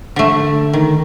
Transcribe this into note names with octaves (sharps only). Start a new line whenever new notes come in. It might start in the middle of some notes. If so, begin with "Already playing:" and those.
D3 A3
D#3